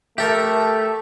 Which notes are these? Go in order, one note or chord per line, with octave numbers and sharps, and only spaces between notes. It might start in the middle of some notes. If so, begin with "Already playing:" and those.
A3 G4 A4 A#4 E5